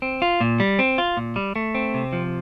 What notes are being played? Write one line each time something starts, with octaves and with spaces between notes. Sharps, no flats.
C4
F4
A#2
G3
C4
F4
A#2
G3
A3
C4
C3
F3